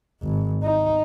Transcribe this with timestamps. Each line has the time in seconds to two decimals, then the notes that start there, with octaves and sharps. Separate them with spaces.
0.22 G#1
0.63 D#4